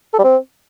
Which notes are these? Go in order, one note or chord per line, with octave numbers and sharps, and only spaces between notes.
A4
G3
C4